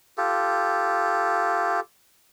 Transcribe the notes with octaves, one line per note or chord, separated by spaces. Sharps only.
F4 G4 A4